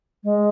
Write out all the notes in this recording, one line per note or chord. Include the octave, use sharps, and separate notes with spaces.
G#3